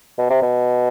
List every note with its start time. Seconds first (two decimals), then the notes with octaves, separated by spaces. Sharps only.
0.18 B2
0.30 C3
0.42 B2